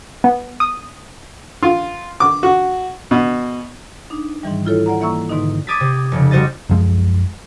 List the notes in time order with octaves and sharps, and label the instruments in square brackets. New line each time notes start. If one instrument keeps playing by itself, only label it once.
[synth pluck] B3
D#6
[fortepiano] F4
D6
F#4
B2
[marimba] D4 D#4
G#2 D#3 E3 G3
E4 F4 A4 C#5
D5 F#5 A#5
E3 A#3 E5 A#5 C#6 E6
G#2 B2 D3 D#3 D#4
[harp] D6 D#6 G#6 A6 B6
C3
F1 C#3
G3 F#4 C5 D#5 A6
[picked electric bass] B1 F#2 F3 G#3